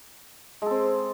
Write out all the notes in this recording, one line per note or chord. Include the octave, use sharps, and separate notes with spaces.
G#3 C4 A4